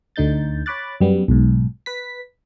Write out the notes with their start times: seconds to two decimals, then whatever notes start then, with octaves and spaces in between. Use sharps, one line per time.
0.16 D2 D3 D#4 G6 A6
0.66 C#5 B5 D6 F#6 A6
1.01 F#2 G3 B3
1.28 B1 G#2
1.86 B4 B6